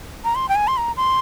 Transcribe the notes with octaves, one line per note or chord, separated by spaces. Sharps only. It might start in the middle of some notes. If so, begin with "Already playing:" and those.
A#5
C6
G5
G#5
C6
A#5
C6